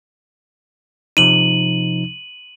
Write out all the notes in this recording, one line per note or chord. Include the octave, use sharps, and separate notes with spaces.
C3 F3 D#4 D#7 F#7